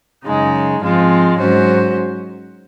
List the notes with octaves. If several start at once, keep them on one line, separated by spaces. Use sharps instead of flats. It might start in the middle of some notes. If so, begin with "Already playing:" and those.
F#2 C#3 G#3 D#4
G#2 F3 G#3 C4 F4
G#2 F#3 C#4 F#4 C5